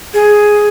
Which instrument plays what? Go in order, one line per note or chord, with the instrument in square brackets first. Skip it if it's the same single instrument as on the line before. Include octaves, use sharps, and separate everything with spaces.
[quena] G#4